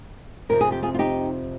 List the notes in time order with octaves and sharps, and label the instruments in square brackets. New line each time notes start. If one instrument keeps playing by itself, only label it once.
[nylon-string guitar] F2 C3 F3 A#4
G#4
G4
F4 G#4
F4
D#4 G4